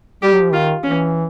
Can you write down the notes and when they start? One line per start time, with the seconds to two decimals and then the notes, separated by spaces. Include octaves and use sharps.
0.22 G3 G4
0.33 F#3
0.42 F3
0.52 D#3 F4
0.83 E3 C#4